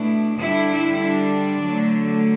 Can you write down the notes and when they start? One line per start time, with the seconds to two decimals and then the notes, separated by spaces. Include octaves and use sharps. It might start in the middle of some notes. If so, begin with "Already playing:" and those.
Already playing: B2 A3 D4 E4
0.40 D3 G3 D4 E4
0.71 E4
1.02 D4
1.65 D3 F#3 A3